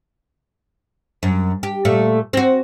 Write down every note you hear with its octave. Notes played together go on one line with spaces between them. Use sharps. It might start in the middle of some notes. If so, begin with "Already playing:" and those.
F#2
G4
A#2 A3
C4 F#4